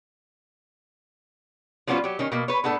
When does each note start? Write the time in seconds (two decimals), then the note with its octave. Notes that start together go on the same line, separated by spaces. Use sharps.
1.87 F3 G3 B3 C#4 F4 F#4
2.04 F#3 G4
2.19 D#3 C#4
2.32 B2 A#3
2.48 B4 C#5
2.64 A2 B3 D4 A4